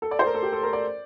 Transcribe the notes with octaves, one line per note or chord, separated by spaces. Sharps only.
A4
D5
C5
A#4
A4
G4
A4
A#4
D5